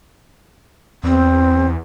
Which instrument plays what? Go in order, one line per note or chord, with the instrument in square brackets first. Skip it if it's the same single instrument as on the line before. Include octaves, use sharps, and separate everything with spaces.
[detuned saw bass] E2 [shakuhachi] C4